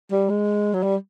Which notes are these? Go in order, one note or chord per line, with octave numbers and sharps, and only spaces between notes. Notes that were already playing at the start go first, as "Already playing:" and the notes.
G3
G#3
F#3
G3